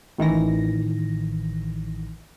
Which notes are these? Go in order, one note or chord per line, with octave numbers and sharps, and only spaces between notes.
A1 D#3 E3 A#6